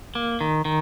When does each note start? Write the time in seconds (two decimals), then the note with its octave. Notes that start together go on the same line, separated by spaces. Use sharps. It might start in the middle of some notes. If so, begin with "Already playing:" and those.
0.15 A#3
0.41 D#3
0.65 D#3